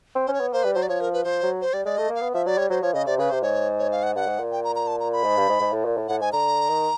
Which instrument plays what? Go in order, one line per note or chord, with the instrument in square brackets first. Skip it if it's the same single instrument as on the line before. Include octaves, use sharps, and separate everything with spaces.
[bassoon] C4
[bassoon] C#4 [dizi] C5
[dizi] C#5
[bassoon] B3
[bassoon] A#3 [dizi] C5
[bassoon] G3 [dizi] B4
[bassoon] F#3 [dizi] C5
[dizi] D5
[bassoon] F3 [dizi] C#5
[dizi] A#4
B4
[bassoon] F3 [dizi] C5
[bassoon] F#3
[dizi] C5
[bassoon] G3 [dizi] D5
[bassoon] G#3 [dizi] D5
[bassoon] A3 [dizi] D#5
[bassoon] A#3
[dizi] F5
[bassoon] B3
[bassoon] F3 [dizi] E5
[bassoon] F#3 [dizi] D5
[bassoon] G3 [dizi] C#5
[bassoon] F#3 [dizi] C5
[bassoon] F3 [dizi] C#5
[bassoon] C#3 [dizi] D#5
[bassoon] C3 [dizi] D5
[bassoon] C#3 [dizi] B4
[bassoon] C3 [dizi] C5
[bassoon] G#2 [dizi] C#5
[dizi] C#5
F5
F#5
[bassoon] G2 [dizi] F#5
[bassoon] G#2
A#2
[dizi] G5
A#5
A#5
A5
A#5
B5
[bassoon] G#2
G2
G#2
G#2
A2
A#2
A2
[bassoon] A2 [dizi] F#5
[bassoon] G#2 [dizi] G#5
[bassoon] D3 [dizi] A#5
[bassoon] D#3